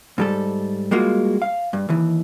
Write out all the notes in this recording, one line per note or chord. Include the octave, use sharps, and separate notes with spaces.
G#2 G3 A4
G3 G#3 A#3 F4 F#4
F5
G2
D#2 E3